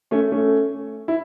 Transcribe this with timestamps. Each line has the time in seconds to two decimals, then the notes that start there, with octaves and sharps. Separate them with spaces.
0.11 A3 C#4
0.32 A3 C#4
1.08 E4